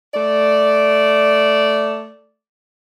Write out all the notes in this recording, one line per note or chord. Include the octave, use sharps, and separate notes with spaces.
A3 D5